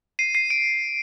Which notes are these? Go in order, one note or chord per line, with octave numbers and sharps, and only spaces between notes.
C7 D#7
C7 D#7
D7